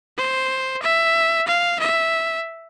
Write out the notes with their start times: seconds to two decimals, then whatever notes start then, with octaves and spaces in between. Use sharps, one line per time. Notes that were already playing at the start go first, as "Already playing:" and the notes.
0.18 C5
0.83 E5
1.48 F5
1.79 E5